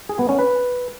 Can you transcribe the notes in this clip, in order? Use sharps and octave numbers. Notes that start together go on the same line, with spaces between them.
G#4
B3
C#4
B4